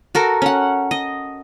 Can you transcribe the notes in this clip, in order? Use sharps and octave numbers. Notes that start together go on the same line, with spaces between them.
F#4 A4 A#4
C#4 F#5
D#5